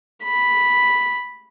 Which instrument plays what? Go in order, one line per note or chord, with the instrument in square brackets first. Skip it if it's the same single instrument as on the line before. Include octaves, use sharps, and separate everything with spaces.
[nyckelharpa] B5